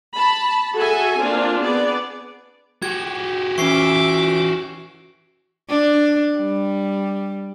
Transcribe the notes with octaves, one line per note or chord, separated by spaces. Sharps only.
A5 B5
F#4 G#4 A4 E5 G#5
A#3 C4 D4 F4
B3 G#4 D5
F#4 G4 G#6
E3 C#4 E5 C#6 D6 C7
D4
G3